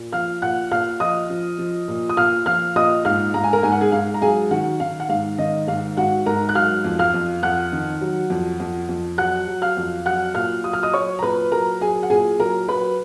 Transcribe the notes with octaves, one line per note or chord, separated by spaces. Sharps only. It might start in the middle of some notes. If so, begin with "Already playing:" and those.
Already playing: A#2
F3 F5 F6
A#2 F#5 F#6
A#2 F5 F6
F3 D#5 D#6
F3
F3
A#2
D#6
A#2 F5 F6
F3 F5 F6
A#2 D#5 D#6
G#2 F5 F6
G#2 A#5
G#5
A#4 A#5
G#2 G#5
F#5
G#4 G#5
G#2 F5
A#5
F#3 G#4 G#5
D#3 F#4 F#5
D#3 F5
F#5
G#2 F5
D#3 D#5
G#2 F5
G#2 F#4 F#5
G#2 A#4 A#5
F#6
F#3 F5 F6
F2
F5 F6
F2
F2 F#5 F#6
D#3
F#3
F2
F2
F2
F#3 F#5 F#6
F#3
F5 F6
F2
F#3 F#5 F#6
A#2 F5 F6
F#3 D#6
F6
D#5 D#6
F#3 C#5 C#6
A#5
A#2 B4 B5
F#3 A#4 A#5
F#3 G#4 G#5
F#5
A#2 G#4 G#5
F#3 A#4 A#5
F#3 B4 B5